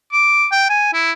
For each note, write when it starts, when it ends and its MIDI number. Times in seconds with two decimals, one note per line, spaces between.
0.13 0.47 86
0.52 0.67 79
0.70 0.90 80
0.94 1.12 64